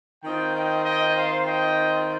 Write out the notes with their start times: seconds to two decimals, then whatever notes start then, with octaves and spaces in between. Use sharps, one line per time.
0.24 D#3 C4 F4 D#5 G5
0.54 D#5 G5
0.85 D#5 G5
1.16 C5 F5
1.46 D#5 G5